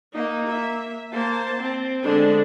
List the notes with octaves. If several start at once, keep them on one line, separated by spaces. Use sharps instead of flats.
A#3 D#4
E5
A#3 C5 A5
C4
D3 G#3 D4